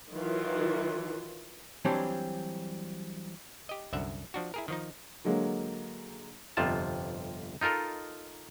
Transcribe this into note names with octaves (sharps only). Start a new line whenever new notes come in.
D#3 E3 F#3 F4
E3 F#3 G3 C4 D4
G4 D#5
C2 F#2 D3 E5 F#5
F3 D4 F#4
E4 G#4 A#4
D#3 F3 D#4
D3 F#3 G#3 A#3
G1 F2 C3 F4 A5
D#4 F4 A4 A#4 D#5